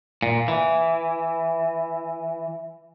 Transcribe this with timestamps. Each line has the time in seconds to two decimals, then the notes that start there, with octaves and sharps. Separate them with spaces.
0.23 A#2
0.48 E3